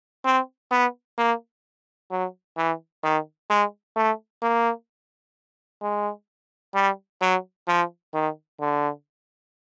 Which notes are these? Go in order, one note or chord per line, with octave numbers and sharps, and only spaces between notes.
C4
B3
A#3
F#3
E3
D#3
G#3
A3
A#3
G#3
G3
F#3
F3
D#3
D3